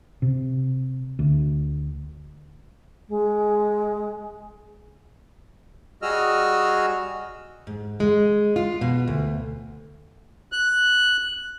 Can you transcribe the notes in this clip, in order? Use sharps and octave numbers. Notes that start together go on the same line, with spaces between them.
C3
D2
G#3
G3 F#4 G#4 D#5 E6 F6
G#2
G#3
F4
B2
D2
F#6